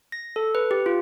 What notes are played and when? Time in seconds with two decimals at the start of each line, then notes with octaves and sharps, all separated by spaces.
0.12 A#6
0.36 A4
0.55 B4
0.71 G4
0.86 F4